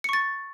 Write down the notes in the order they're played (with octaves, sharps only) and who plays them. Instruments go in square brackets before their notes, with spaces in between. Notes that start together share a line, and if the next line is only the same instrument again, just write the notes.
[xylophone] C#7
C#6
A6